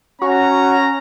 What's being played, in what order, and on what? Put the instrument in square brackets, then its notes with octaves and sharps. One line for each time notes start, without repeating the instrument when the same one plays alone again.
[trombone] C#4 [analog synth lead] F#4 [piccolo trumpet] A#5